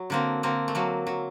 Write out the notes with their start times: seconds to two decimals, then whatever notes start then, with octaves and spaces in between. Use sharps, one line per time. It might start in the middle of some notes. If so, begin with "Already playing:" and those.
Already playing: F#3
0.10 D3 A#3 C4
0.43 D3 A#3 C4
0.68 A3
0.75 F#3 A#3
1.07 F#3